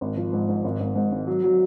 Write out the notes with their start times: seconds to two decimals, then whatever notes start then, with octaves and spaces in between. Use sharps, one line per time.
0.01 G#1
0.17 F3
0.33 G#2
0.48 G#2
0.64 G#1
0.80 G#1
0.95 G#2
1.12 G#1
1.27 F#3
1.44 F#3